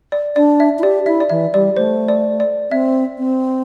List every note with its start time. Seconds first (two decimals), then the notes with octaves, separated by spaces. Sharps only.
0.12 D5
0.36 D4 D5
0.60 E5
0.79 E4
0.83 G4 D5
1.06 E4 E5
1.20 D5
1.30 E3 E5
1.54 G3 D5
1.77 A3 C5
2.08 D5
2.40 D5
2.71 C4 E5
3.18 C4